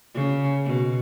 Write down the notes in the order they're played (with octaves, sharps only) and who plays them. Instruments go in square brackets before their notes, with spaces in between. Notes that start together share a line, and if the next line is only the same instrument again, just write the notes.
[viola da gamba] C#3
B2